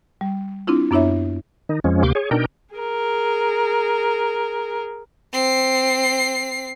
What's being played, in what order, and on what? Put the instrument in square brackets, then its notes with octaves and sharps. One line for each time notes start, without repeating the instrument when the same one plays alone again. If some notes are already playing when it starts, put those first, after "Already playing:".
[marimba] G3
C4 D4 E4 F4
F#2 B3 D4 E4 C#5 E5
[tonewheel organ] D#3 D#4
F2 F3 G#3 C#4
D2 C3 A#3 G4 C6 D6
G#4 C#5
B2 D4 D#4 A#4 G5
[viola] G#4 A#4
[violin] C4 C7